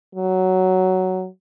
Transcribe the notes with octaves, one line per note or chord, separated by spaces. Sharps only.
F#3